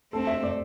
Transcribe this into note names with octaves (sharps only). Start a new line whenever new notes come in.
A3 C4 A4
E5
D5